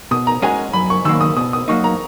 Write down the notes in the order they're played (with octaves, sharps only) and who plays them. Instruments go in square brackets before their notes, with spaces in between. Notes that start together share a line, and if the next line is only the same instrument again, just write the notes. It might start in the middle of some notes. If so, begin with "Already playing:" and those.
[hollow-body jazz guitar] B2 [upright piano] D#6
[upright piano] A#5
[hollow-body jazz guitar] G#3 C#4 F#4 [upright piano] G#5
[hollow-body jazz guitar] F#2 [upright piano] B5
[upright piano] C#6
[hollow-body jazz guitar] D#3 F#3 A#3 [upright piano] E6
[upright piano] D#6
[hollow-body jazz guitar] B2 [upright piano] D#6
[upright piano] D#6
[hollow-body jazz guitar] F#3 A#3 D#4 [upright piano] C#6
[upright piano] A#5